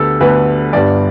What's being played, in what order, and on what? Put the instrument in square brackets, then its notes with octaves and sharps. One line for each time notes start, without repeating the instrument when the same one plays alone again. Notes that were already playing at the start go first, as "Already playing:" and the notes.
Already playing: [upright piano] D2 D3 B3 G4 A4
D2 D3 B3 B4
G1 G2 G3 B3 D5